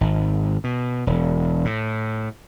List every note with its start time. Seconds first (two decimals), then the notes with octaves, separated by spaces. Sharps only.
0.01 G#1
0.64 B2
1.07 E1
1.65 A2